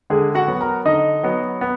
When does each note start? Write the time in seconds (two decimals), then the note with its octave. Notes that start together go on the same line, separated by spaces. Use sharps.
0.10 D3 G#3 G#4
0.35 F#4 F#5
0.48 F#3 B3
0.61 A#4 A#5
0.85 D3 D#4 D#5
1.23 F#3 B3
1.61 B3